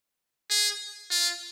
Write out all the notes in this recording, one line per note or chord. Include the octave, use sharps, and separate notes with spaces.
G#4
F4